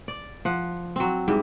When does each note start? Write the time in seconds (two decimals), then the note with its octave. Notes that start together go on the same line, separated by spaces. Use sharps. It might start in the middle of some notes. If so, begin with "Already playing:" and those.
0.08 D5
0.45 F3 F#5
0.96 F#3 C4
1.28 G#2 G3 E4